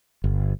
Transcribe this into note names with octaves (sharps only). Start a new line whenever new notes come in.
G1